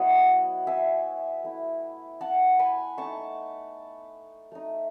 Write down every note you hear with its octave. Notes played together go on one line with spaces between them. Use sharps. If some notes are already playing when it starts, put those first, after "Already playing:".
Already playing: F#3 B3 E4 C#5 D#5 F#5
E5 G#5
A3 E4
F#5 A5
G#5 B5
A3 D#4 A5 C#6
A3 D#4